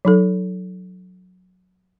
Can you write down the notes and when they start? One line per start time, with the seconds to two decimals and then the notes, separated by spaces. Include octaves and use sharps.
0.05 F#3 D#4 A4